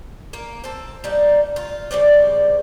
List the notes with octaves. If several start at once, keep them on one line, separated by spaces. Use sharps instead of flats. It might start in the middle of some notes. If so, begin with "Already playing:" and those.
A#3
C4 A4
G3 A#3 D#4
F4
C#3 G3 C4 D5